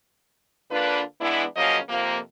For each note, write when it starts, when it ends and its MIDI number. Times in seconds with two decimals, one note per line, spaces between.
0.71 1.01 50
0.71 1.01 58
0.71 1.01 62
0.71 1.01 65
0.71 1.01 71
1.21 1.44 52
1.21 1.44 56
1.21 1.44 59
1.21 1.44 62
1.21 1.44 64
1.57 1.78 49
1.57 1.78 53
1.57 1.78 54
1.57 1.78 58
1.57 1.78 61
1.57 1.78 75
1.89 2.18 41
1.89 2.18 48
1.89 2.18 53
1.89 2.18 58